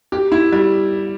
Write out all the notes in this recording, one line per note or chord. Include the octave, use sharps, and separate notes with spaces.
G4
E4
G3